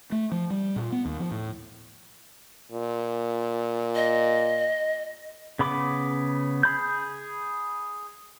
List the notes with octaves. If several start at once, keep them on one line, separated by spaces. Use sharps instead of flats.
A3
F3
G3
A#2
B3
D#2
F3
A2
A#2
D#5
C#3 B3 B5 D6
G#4 B5 G6